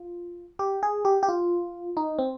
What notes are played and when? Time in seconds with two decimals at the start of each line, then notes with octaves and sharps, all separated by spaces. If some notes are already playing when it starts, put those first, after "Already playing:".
Already playing: F4
0.59 G4
0.83 G#4
1.05 G4
1.23 G4
1.29 F4
1.97 D#4
2.19 C4